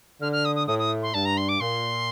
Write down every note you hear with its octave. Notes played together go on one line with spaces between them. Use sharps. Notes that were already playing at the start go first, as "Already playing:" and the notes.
D3 F6
F6
D#6
D#6
A2 D#6
D#6
C6
G2 A5
A#5
C6
D6
A#2 C6